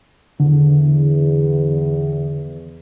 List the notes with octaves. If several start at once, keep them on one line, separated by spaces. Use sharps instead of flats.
E2 D3